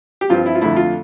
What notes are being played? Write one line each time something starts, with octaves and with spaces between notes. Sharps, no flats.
G4
G2 F3 C4 F4
E4
F4
F2 D3 A3 E4
F4